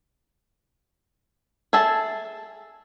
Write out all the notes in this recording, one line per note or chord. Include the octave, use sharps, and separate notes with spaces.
G#4 A4 E5 A5